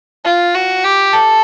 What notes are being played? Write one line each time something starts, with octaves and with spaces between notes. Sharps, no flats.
F4
F#4
G4
A4